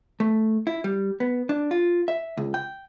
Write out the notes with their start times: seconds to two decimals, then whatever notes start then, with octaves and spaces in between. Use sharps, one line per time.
0.20 A3
0.67 E4
0.84 G3
1.20 B3
1.49 D4
1.71 F4
2.08 E5
2.37 C#2
2.54 G5